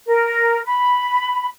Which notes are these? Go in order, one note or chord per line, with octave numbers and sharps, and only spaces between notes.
A#4
B5